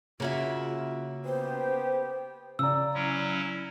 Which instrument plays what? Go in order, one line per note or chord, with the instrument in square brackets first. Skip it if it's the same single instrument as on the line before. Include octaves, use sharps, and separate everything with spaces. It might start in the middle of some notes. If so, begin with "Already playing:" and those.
[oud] C#3 C#4 [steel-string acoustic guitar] A#3 F#4 E5 [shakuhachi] F4
[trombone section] B3 G4 [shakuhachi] C5
[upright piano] C#3 D5 [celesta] A#5 E6
[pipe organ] F#3 C#4 E4